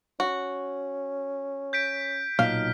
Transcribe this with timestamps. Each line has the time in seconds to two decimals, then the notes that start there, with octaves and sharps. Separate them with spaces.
0.20 C#4 F#4
1.73 G6 B6 D7
2.39 B1 A#2 D#4 F5 F6 B6